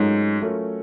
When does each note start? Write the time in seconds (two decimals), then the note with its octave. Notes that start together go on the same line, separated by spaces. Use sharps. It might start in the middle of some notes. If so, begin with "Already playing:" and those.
Already playing: G#2 F#3 A3 C#4 F4 A#4
0.41 F#3 A3 C#4 F4 A#4